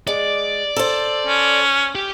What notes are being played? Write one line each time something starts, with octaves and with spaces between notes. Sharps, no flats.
G#3 D5
A4 C5
C#4
G4